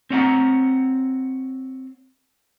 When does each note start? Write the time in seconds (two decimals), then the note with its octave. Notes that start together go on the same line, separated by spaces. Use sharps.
0.10 C4 C#5 F#5 A#5